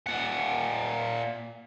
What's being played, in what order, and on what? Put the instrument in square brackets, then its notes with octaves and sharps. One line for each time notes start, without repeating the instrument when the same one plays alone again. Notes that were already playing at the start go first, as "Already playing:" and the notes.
[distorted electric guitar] A#2 F#5